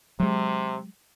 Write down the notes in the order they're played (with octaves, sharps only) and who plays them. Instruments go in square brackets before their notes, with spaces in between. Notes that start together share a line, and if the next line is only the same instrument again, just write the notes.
[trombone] C3 [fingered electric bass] F#3 G#3